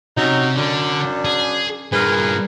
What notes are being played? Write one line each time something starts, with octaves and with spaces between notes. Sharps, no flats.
C3 F#3 C#4 D#4 E5
F#2 D3 D4
G#4
G2 A#2 G#4 A#4 B4